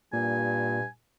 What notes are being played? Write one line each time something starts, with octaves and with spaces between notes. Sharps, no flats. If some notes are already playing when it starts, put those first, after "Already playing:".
G2 A#2 G#5